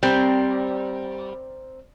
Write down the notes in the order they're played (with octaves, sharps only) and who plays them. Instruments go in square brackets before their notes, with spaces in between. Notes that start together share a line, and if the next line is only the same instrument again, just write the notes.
[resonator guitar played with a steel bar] G3 [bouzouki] C4 A#4